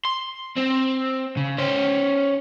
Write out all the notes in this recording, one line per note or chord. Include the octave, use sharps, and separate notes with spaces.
C6
C4
C#3
C#4 C5